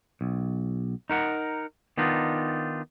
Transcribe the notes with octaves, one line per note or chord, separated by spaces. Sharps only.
B1
D#4 A#4 F#5
D#3 B3 D4 D#4 F4